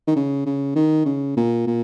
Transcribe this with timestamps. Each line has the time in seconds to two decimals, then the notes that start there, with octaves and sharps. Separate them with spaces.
0.07 D#3
0.16 C#3
0.46 C#3
0.76 D#3
1.06 C#3
1.37 A#2
1.67 A#2